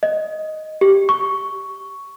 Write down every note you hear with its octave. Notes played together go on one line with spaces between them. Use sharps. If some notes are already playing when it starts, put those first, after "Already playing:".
D#5
G4
C#6